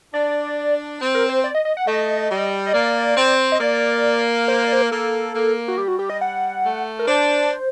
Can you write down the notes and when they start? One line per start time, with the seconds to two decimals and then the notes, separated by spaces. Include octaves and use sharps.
0.13 D4 D5
1.01 C4
1.15 A#4
1.29 C5
1.44 D5
1.55 D#5
1.65 D#5
1.77 F#5
1.87 A3 D#5
2.31 G3
2.66 D#5
2.73 A#3 D5
3.17 C4
3.52 D#5
3.60 A#3 D5
4.48 C5
4.64 D5
4.73 C5
4.82 A#4
4.91 A#3 A4
5.35 A#3
5.68 F#4
5.78 G3 G4
5.88 F#4
5.99 G4
6.10 D#5
6.21 F#5
6.64 A3
6.99 A#4
7.08 D4 C5